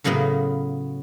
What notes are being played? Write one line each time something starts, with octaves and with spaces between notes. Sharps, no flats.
A2 C#3 F#3 A#3 B3